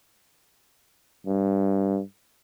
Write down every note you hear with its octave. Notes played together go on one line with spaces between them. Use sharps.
G2